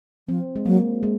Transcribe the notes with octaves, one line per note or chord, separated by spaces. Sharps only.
F3 C4
G#3
F#3 A#3
G#3